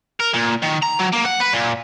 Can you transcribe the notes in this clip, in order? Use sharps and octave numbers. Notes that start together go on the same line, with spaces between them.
A#4
A#2
D#3
A#5
F#3
A#3
F#5
B4
A#2